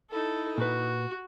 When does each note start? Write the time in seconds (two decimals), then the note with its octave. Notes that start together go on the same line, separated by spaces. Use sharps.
0.11 D#4 E4 A4
0.58 A#2 F#4 B4